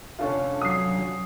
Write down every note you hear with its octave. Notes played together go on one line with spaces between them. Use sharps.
F1 D3 C#4 F4 A4 F5
F#3 F5 G#5 D#6 C7